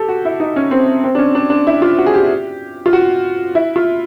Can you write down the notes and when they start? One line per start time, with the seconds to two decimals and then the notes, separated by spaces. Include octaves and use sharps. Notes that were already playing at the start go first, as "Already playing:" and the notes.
Already playing: G4 A4
0.09 F#4
0.25 E4
0.40 D#4
0.56 C#4
0.71 C4
1.04 C4
1.15 D4
1.18 C#4
1.35 D4
1.50 D4
1.67 E4
1.82 F4
1.98 F#4
2.06 G#4
2.14 G4
2.86 F4
2.93 F#4
3.55 E4
3.76 F4